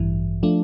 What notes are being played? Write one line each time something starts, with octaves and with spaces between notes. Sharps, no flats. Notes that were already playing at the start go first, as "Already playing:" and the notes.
Already playing: A1 G2 E3
F3 A3 D4